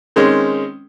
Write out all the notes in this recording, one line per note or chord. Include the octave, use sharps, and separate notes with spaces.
D#3 G#3 C4 C#4